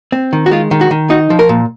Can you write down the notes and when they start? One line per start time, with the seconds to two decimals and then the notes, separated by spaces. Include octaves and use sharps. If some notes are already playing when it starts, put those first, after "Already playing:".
0.12 C4
0.33 D#3
0.46 F#4
0.51 G#3 F4
0.71 D#3
0.81 F#4
0.91 D#3
1.10 D#4 F#4
1.30 F3
1.39 A#4
1.49 A#2